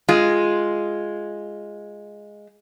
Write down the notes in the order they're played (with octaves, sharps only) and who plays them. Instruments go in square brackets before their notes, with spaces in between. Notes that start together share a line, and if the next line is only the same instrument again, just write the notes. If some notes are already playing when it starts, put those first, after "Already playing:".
[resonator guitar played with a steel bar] G#3 F4